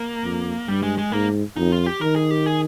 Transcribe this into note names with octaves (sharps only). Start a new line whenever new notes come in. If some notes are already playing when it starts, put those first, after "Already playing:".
Already playing: A#3
F2
G2 G3
G#3
G#3
G#2 A#3
F2 D#4
F4
G4
D#3 A#4
G#4
G4
G#4